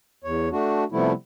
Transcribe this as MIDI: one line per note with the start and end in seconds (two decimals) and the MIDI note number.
0.24 0.49 40
0.24 0.49 73
0.52 0.84 57
0.52 0.84 62
0.52 0.84 66
0.92 1.13 48
0.92 1.13 53
0.92 1.13 55
0.92 1.13 57
0.92 1.13 59
0.92 1.13 64